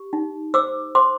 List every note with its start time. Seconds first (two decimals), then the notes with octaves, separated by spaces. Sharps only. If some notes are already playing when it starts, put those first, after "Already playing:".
Already playing: G4
0.13 D#4
0.54 C5 D6 E6
0.95 C5 C6 D6